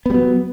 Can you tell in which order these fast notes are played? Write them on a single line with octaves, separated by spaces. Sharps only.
B3 G3 F#3